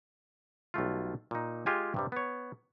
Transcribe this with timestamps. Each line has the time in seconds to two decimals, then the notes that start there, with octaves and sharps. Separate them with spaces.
0.74 B1 G3 A3 F4
1.31 A#2 D#4
1.66 G#3 F4 G4 G5 G#5
1.94 G2 C3 G3
2.12 B3 C#5